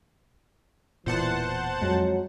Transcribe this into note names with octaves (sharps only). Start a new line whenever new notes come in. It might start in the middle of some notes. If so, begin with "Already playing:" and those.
E1 A#2 E3 C5 F#5 A5
F2 F#3 G#3